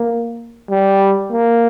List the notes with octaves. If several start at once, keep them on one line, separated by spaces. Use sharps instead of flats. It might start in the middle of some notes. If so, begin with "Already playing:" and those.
Already playing: A#3
G3
A#3